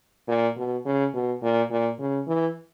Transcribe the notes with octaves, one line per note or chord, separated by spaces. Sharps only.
A#2
B2
C#3
B2
A#2
A#2
C#3
E3